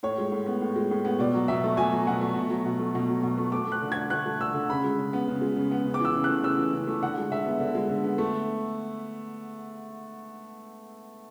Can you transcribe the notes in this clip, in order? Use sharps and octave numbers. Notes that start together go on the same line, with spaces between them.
A2 C#5
G#3
A2
B3
A2
G#3
A2
B3
B2 D5
F#3
B2 E5
A3
B2 G#5
F#3
B2 F#5
A3
B2
F#3
B2
A3
B2
F#3
B2
A3
A3 D6
A3 F#6
D3
D3 G#6
A3 F#6
A3
D3 E6
D3
C#3 B5
G#3
C#3
B3
C#3
G#3
C#3
B3
C#3
D6
E3 E6
C#3
A3 F#6
C#3 E6
E3
C#3
A3
D3 F#5
G#3
D3 E5
B3
D3
G#3
D3
B3
A3